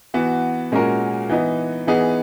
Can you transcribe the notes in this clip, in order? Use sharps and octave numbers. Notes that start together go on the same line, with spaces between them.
E3 B3 F#4
A#2 G#3 C#4 F#4 A#4
E3 B3 D#4
E3 B3 D#4 G#4